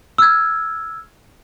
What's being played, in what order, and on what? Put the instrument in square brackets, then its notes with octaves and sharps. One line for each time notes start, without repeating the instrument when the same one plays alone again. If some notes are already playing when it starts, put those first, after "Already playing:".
[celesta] E6 F6 G#6